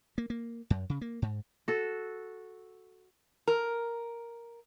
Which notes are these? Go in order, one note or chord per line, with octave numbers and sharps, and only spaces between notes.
A#3
A#3
F#2
C#3
A#3
G#2
F#4 A4
A#4